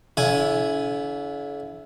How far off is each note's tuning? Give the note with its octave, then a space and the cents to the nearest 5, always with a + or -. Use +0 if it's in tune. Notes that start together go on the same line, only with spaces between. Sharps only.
D3 -45 E4 +0 G#5 +0